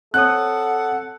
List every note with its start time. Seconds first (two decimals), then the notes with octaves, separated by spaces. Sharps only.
0.14 C4 A4 C#5 F#5 D#6 F#6